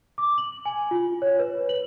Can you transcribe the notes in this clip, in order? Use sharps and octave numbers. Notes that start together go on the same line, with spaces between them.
D6
F#7
G#5
F4
C#5
B4
F#7